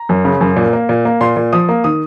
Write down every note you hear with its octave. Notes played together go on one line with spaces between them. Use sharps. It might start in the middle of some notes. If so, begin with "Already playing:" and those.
Already playing: A#5
F#2
C#3
F#2
A#2
A#3
A#2
A#3
A#2 C6
A#2
F3 D#6
A#3
D#3 D#6